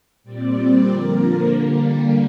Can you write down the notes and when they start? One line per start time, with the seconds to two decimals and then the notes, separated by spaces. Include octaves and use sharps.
0.23 A#2 G3 C4 D5
0.56 D5
0.87 D3 F3 A#3 A#4
1.50 D3 G3 A#3